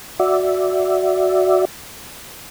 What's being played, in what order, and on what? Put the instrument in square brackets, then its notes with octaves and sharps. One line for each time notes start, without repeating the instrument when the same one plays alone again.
[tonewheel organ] F#4 D5 E5